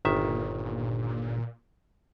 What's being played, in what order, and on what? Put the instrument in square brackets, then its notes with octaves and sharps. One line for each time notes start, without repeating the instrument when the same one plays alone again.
[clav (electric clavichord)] G1 D#3 E5 [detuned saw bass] A#2